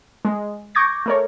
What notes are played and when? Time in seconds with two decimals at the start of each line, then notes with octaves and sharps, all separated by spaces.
0.25 G#3
0.75 C#6 D6 G6 G#6 A#6
1.06 A3 A#4 C#5